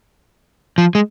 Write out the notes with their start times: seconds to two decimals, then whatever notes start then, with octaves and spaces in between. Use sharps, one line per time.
0.78 F3
0.95 G#3